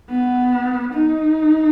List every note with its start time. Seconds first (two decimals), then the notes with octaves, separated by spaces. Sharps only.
0.10 B3
0.94 D#4